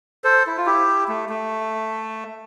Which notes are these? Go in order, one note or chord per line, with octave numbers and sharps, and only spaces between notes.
A4 C5
E4
F4
E4 G4
A3
A3